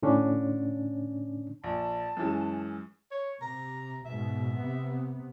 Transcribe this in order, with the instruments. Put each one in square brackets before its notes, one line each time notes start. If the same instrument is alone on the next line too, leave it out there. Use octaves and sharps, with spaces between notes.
[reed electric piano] A2 D3 C#4 D4
[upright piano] A#1 [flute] A5
[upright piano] F#2 E3 G#3
[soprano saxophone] C#5
[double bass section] C3 [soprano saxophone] A#5
[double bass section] G#2 B2 [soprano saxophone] E5
[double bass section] C3 B3